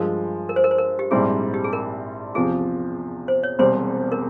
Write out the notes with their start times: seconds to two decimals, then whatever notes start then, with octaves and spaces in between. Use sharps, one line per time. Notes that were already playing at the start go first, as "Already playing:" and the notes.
Already playing: G2 F3 G#3 A#4
0.49 A#4
0.56 C5
0.64 A#4
0.71 C5
0.78 A#4
0.99 G4
1.11 A#1 G#2 G3 C4 E4 G#4
1.54 G4
1.64 G#4
1.73 A#4
2.35 E2 C3 F3 G#4
3.28 C5
3.43 C#5
3.59 E1 E2 C3 G3 C4 C5
4.12 A#4